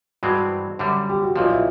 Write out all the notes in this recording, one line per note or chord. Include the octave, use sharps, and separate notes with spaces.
G2 E3 G#3 C4 F#4
F#2 D3 G3
G4
F#4
B1 A#2 F3 F4
E4